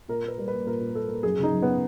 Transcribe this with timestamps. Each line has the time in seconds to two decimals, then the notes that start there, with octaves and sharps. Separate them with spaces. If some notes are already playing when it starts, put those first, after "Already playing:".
0.08 A#2 A#4
0.24 A#3 B4
0.38 G3 A#4
0.48 A#3 B4
0.66 A#2 A#4
0.81 A#2
0.95 A#3 A4
1.09 A#3
1.23 F#2 G#4
1.38 C#3
1.43 D#4
1.52 F#2
1.62 B3